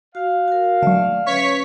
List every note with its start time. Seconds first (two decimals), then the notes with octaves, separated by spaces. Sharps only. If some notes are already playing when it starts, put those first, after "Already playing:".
0.15 F#4 F5
0.48 F#4 A#4
0.82 D3 F#3 A3 D5 E5
1.26 C#4 B4 C#5 C#6 B6